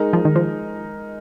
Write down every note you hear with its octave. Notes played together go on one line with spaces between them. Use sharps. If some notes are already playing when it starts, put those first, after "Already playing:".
Already playing: G#3 D#4 A#4
F3
D#3
F3